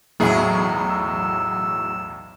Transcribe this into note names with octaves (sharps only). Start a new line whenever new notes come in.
B1 E2 A2 F#3 E4 G#4
E6